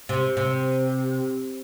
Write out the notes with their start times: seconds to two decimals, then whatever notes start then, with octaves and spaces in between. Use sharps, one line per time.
0.09 C3
0.37 C3